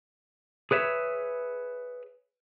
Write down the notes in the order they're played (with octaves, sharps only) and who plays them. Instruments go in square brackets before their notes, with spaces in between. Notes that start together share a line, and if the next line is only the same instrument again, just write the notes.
[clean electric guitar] G#4 B4 C#5 E5